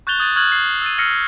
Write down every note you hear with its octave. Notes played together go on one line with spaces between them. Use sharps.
C#6 F#6 G6 A6 F7 G7
D#6 G#6 A6 D#7
C#6 F6 F#6 G#6 F#7
C7
E6 A6 D#7
E6 F6 A#6 C7 C#7